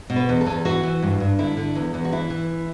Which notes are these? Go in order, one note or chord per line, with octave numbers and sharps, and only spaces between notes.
B2
B4
E2
A4
E2
E3 F#4
E3
G2
G2
D3 E4
D3
E2
E2
F#4
E3 E4
E3